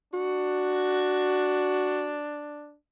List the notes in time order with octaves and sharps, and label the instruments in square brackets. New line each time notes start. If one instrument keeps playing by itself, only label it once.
[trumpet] D4 [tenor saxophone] F#4